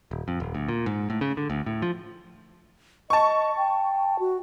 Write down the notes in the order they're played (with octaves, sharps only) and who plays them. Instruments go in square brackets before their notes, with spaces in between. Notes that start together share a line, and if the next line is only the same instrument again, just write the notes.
[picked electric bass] D#1
F2
D#1
D2
A#2
G#2
A2
C#3
D3
D2
A2
F3
[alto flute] D#5 [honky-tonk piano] A5 C#6
[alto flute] G5
F#4